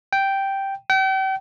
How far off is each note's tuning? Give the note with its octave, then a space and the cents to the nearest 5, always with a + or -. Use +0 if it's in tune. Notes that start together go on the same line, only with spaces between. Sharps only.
G5 -5
G5 -40